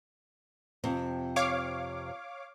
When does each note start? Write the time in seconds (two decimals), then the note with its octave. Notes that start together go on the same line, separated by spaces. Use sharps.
0.84 F2 C3 C4
1.36 C#5 F5 D6